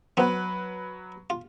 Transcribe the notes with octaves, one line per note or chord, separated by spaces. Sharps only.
F#3 B3 C4 B4
F4